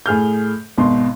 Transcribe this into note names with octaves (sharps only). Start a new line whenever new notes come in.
A2 G#4 F6 G6
G#1 B2 C6